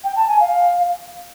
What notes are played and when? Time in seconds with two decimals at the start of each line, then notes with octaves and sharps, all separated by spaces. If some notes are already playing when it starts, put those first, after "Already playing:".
0.04 G5
0.16 A5
0.28 G#5
0.40 F5